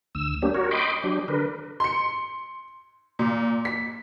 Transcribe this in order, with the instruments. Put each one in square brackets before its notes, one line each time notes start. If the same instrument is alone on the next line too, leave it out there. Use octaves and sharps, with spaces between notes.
[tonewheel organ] D2 E6
G3 A#3 C#4 D4 G4
F#4 A#4 C#5
D#5 G5 B5 C6 D6
F#3 D4 G4
D3 A#4 B4
[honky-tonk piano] C6 C#7
A#2
B6